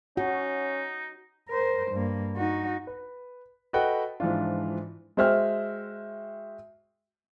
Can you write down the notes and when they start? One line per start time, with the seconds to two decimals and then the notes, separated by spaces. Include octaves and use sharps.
0.17 C#4 D#4 F#4
1.49 A#4 C5
1.91 G2 A#3
2.36 D#4 F#4
2.87 B4
3.73 F#4 A4 B4 D#5 F#5 G5
4.20 G#2 E3 F3 D4 F4
5.17 G#3 F#4 C5 E5 G5 F6